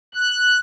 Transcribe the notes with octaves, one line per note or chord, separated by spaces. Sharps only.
F#6